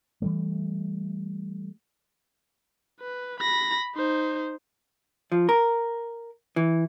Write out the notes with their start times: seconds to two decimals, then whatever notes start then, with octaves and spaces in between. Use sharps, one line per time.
0.22 E3 G3 A3
3.00 B4
3.40 B5 A#6
3.95 D#4 C5
5.32 F3
5.49 A#4
6.56 E3